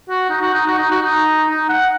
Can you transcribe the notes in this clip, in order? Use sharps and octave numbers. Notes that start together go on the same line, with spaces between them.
F#4
D#4
F#4
D#4
F#4
D#4
F#4
D#4
D#4
F#5